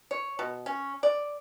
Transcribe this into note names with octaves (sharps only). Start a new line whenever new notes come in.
C#5
B2
C#4
D5